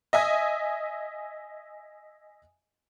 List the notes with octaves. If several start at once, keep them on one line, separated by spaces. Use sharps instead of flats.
D#5 E5 G#5 D#6